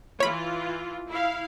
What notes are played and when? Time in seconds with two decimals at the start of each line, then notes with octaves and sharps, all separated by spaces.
0.20 E3 F4 C#5 B5
1.09 E4 F5